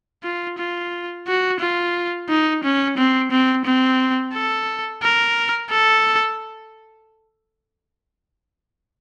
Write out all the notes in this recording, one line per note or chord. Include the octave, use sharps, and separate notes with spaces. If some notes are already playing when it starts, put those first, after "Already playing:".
F4
F4
F#4
F4
D#4
C#4
C4
C4
C4
A4
A#4
A4